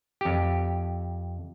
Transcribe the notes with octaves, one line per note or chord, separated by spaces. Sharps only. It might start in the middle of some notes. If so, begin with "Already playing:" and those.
F2 G4